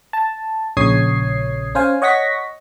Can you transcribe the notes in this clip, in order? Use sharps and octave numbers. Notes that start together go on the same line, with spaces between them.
A5
A#1 C#3 C#5 D#6 G#6 C7
C#4 C5 F5 G#5
C#5 D#5 F#5 C#6 A#6 B6